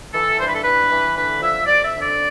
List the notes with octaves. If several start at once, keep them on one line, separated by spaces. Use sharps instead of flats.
E3 A4
G2 C5
B4
A4
E3 B4
E3
D3 B4
F3 E5
F2 D5
E5
D3
D5